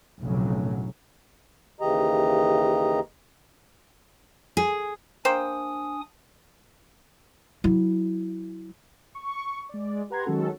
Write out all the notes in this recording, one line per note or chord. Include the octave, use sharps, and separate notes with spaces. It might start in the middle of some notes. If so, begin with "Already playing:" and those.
F1 B1 A2 C#3 F#3
D#2 C#3 E3 G4 D#5 A#5
G#4
A#3 D4 C5 G5 G#5 D#6
F#3 E4
C#6
G#3 D5
G4 B4 F#5 A#5 C6 G#6
D#3 F#3 G#3 C#4 F#4 A4